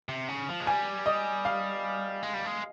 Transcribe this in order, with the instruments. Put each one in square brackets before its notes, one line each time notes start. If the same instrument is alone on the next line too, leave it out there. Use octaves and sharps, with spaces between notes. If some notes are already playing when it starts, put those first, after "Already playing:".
[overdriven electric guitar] C3
C#3
F3
G#3
[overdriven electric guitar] G3 [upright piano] G#5
[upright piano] D#5
F5
[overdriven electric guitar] G#3
G3
G#3